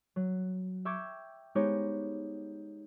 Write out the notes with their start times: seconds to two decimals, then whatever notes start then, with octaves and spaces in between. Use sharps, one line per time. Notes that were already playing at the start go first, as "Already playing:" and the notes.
0.16 F#3
0.85 E5 G5 C#6 D6 G#6
1.55 G#3 B3 D#4 G4 C5 C#5